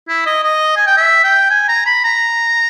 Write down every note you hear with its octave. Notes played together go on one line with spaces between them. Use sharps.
E4
D#5
D#5
G#5
G5
E5
G5
G#5
A#5
B5
A#5